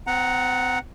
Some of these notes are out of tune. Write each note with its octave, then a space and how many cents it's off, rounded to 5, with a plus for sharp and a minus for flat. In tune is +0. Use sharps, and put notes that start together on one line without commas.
C4 -35 F#5 +0 A#5 +0